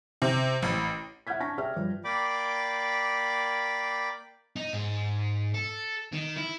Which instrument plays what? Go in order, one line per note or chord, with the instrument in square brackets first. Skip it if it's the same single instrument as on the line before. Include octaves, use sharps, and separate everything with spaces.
[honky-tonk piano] C3
A1
[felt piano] E5 F#5 F6 G6 G#6 B6
D4 A5 C#6 A#6 B6
G4 G#4 D5 E5 G5 F6
G2 F3
[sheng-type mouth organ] A#3 D5 G5 B5 D6
[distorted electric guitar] D#4
G#2
A4
D#3
E4